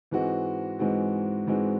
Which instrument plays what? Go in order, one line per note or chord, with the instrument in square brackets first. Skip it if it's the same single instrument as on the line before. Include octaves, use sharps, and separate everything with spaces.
[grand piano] G#2 E3 G#3 C4 F#4
G#2 E3 G#3 C4 F#4
G#2 E3 G#3 C4 F#4